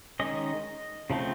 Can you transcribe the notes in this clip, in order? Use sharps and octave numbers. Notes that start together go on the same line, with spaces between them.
D#3 G#3 C#4 D#5
C#3 F3 A3 C4